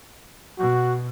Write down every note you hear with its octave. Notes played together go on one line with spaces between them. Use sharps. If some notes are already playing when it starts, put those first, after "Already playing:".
B2 F#4